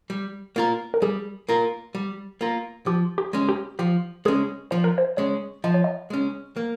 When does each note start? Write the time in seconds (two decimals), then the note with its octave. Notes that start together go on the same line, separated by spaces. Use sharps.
0.10 G3
0.56 A#3 F4 A#4
0.94 A#4
1.02 G3 G#4
1.49 A#3 F4 A#4
1.95 G3
2.41 A#3 F4 A#4
2.86 F3 G4
3.18 G4
3.33 G#3 C#4
3.49 G4
3.79 F3 G4
4.25 G#3 C#4 G#4
4.71 F3 C5
4.84 A#4
4.98 C5
5.17 G#3 C#4 C#5
5.64 F3 D#5
5.74 C#5
5.84 D#5
6.10 G#3 C#4
6.56 A#3